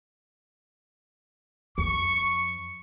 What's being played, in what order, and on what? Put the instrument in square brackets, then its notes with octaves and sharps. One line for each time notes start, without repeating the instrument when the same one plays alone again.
[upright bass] F2 [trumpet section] C#6